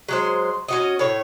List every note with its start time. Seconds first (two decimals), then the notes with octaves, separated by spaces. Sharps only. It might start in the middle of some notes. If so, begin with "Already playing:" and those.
0.08 F#3 G#3 C5
0.68 C#4 F#4 D#5
0.99 A2 C#5